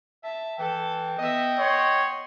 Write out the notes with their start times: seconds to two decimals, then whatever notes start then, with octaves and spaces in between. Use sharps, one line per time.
0.24 E5 A5
0.59 E3 A4 G5 A5
1.19 B3 D#5 E5
1.59 C#5 F#5 C6